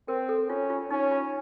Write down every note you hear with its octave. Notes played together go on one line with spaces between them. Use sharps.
C4 A#4
A4
C#4 F4
F4
C#4 D#4
F4